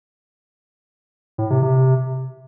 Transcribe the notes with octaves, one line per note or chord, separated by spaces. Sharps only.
A2
C3
C3